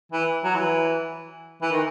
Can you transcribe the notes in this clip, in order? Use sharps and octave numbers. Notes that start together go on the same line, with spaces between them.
E3
F#3
E3
E3
D#3